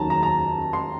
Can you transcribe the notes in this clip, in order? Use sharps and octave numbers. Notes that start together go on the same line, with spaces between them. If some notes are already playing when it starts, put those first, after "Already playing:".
Already playing: D#2 D#3 F#3 A5 A#5
A#5
A#5
C6